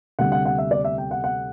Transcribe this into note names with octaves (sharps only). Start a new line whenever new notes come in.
D2 C3 G3 F#5
F#5
F#5
E5
D5
E5
G5
F#5
F#5